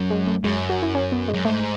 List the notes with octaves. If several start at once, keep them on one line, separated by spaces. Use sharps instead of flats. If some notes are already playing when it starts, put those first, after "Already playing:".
Already playing: F#2
G#3
A3
F#2 G#3
F#4
E4
C#4
B3
G#3
F#2
G#2 A3